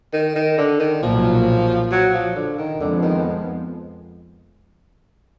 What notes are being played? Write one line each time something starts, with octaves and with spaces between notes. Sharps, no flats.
D#3
D#3
D3
D#3
B1 A#2 F3 F#3 A#3
F#3
F3
D3
D#3
F2 D3 F3 G#3 B3
D#3